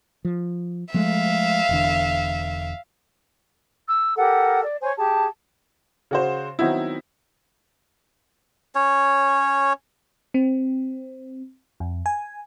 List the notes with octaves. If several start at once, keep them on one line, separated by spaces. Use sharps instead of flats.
F3
F3 G#3 A3 E5 F5
E1 E2 D3
E6
G4 A4 A#4 F#5
D5
C5 C#5 G#5
G4 G#4 A5
C#3 F#4 C5
D#3 F#3 B3 C4 D#4 E4
C#4 C#5
C4
F2
G#5